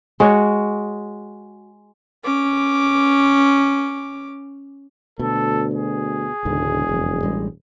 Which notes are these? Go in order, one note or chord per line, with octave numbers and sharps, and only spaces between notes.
G#3 F#4 C#5
C#4 D6
D2 B2 A4
G#4
E1 C#2 G#2 D3
F#1 F2
A1 G3 G#3